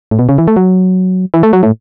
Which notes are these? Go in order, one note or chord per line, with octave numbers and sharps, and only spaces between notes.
A2
B2
C#3
E3
A3
F#3
E3
A3
F#3
A2